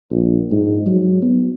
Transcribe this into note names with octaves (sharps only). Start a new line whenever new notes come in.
A#1
G#2
F#3
B3